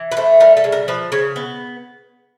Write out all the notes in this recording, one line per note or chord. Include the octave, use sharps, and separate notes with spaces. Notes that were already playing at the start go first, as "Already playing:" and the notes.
Already playing: E3
B4
A3 C5
G3 A#4
A4
C#3
A#4
F3 B4
C#3 C#5
B3